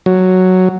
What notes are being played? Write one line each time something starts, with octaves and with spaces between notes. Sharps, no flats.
F#3